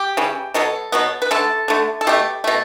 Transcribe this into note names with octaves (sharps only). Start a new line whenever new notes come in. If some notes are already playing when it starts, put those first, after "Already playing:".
Already playing: G4
C#3 E3 G3
B2 F#3 B3 A4
B2 F#3 B3
B4
D3 A3 A4
D3 A3
A4
B2 A3 G4
B2 A3